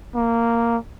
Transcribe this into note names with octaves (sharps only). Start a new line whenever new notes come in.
A#3